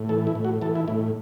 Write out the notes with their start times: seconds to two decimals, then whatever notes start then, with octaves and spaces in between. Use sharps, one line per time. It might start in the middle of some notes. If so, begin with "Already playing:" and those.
Already playing: A2
0.09 E3 A4
0.27 E4
0.35 A2
0.45 F#4
0.62 E3 A4
0.75 E4
0.88 A2 E4